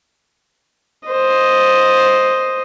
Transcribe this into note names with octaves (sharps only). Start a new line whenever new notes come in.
C5 D#5